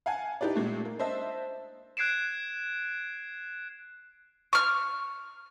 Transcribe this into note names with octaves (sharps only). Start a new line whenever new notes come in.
F5 F#5 G#5 A5
D#4 E4 G4 B4 D5
A#2 G#3 A3
A#3
D4 C5 D#5 E5 A5
F#6 G#6 C7 D7 E7
C#6 F6